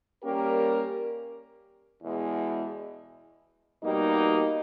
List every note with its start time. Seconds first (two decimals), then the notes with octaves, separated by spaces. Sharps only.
0.23 G3 A#3 C#4 G4 A#4
2.03 E2 B2 G#3
3.83 B2 G3 A#3 D#4 G4